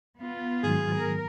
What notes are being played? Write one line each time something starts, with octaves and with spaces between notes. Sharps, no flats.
B3 F4
G#2 D#3 F#3 G#4
A#4